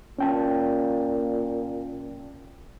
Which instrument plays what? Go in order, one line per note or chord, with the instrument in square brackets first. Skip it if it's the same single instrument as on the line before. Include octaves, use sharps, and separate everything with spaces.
[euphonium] A#2 [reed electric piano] C#4 G5 A5